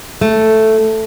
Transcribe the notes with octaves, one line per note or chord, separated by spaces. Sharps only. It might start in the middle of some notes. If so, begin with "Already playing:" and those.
A3